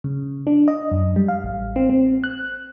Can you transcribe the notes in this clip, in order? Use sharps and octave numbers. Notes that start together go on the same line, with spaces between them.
C#3
D4
D#5
F#2
G3
F5
A1
C4
C4
F#6